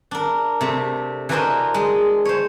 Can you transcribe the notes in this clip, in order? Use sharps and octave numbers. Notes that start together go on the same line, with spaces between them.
D4 A#4
C3 A3
E3 D4 F#4 A#4 C5 D#5
G#3
C5 C#5